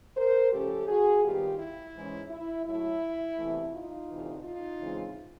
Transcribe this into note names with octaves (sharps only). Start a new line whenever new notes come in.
A#4 C5
C#3 F3 A3 C#4 G4 A4
F#4 G#4
D#2 D#3 G3 B3 F4 G4
E4
G#2 E3 G#3 C#4
E4
A2 F#3 A3 E4
E2 C3 E3 A3
D#4 F4
D2 C3 E3
D#4 F4
C#3 E3 G#3 C4